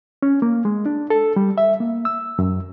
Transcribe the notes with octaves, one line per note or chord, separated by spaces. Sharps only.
C#4
A#3
G#3
D4
A4
G3
E5
A#3
E6
F#2